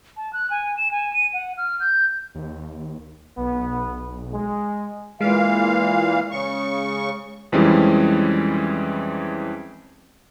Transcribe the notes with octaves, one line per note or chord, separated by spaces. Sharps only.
A5
F#6
G#5
E7
G#5
D#7
F#5
F6
G6
D#2
B1 B3
G#3
A#2 E3 G#3 F5
C#3 C#6
F2 E3 G3 G#3 C4 C#4